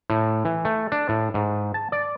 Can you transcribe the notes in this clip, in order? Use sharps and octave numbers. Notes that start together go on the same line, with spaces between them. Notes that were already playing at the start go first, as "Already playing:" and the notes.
A2
E3
A3
D4
A2
G#2
A5
D5